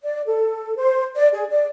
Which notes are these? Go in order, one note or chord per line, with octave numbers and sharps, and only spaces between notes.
D5
A4
C5
D5
G#4
D5